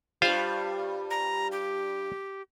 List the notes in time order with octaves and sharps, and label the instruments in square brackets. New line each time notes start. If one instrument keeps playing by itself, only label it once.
[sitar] G2 G3 [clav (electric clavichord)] F4 C5 F5
[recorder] A#5
G4